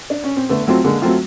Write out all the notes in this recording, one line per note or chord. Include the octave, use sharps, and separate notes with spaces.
D4
C#4
C4
D3 A3 B3
F#3 A3 C4 F4
D3 G#3 A#3
F#3 A3 C4 F4